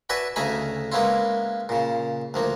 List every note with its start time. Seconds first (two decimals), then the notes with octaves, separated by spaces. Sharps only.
0.10 F#4 B4 D5 E5 G#5 A5
0.36 D2 C#3 A3 D#4 G#5 B5
0.92 G#3 A#3 B3 C#4 E4 F4
1.69 A#2 C#3
2.34 D2 F3 A#3